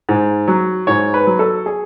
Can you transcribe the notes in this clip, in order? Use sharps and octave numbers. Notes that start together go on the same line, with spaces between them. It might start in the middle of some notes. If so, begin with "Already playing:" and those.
G#2
F#3
G#2 C#5
B4
F#3
A4
G#4